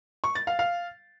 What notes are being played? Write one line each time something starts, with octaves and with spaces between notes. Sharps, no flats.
C#6
A6
F5
F5